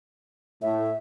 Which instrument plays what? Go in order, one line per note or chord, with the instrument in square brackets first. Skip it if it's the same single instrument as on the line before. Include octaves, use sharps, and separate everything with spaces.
[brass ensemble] A2 [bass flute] E5